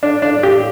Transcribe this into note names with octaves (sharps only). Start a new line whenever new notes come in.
D4
D4
G4